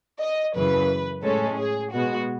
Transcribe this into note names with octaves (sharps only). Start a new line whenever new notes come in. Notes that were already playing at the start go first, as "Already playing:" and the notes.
D#5
F#2 C#3 E3 B4
A2 G#3 C#4 A4
G#4
B2 G#3 B3 F#4